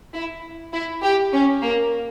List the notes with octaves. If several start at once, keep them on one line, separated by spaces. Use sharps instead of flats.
E4
E4
G4
C#4
A#3